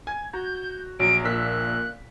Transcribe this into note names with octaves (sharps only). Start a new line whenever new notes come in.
G#5 G#6
F#4 A#5 G6
A#1 F#3 D7
A#2 E6 F#6 B6